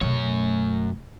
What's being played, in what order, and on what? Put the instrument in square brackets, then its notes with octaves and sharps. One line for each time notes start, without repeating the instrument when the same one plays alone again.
[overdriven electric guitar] F#2 C#5 [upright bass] B2 A3